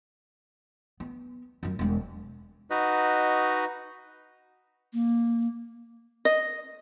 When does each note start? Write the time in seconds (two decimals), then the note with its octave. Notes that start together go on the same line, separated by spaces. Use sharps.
1.00 B3
1.63 F#2 F#3
1.79 E1 G#3
2.70 D#4 F#4 B4 D#5
4.94 A#3
6.25 D#5